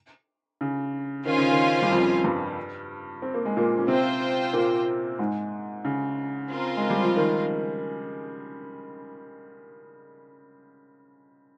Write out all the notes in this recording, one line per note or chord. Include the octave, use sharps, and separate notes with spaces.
C#3
D#3 C#4 F4 C5 F5 G#5
C#3
D#3
G3
F2 F3
G2 G3
C4
A#3
G#3
A#2 A#3
C#4
C3 C4 F4 C5 G5
A#2 A#3
G#2 G#3
C#3
C4 F4 A#4
G#3
G3
F3
D#3